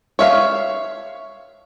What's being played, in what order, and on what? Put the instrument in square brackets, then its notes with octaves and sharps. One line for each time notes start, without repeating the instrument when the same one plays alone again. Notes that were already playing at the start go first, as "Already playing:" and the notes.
[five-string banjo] C#5 E5 F5